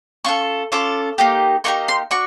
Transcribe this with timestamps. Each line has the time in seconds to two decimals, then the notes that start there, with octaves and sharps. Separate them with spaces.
0.24 C#4 F4 A4 C#6
0.72 C#4 F4 A4 D6
1.18 A#3 D#4 G4
1.64 A#3 D#4 G4 C#6
1.88 C6
2.11 D4 F#4 C#6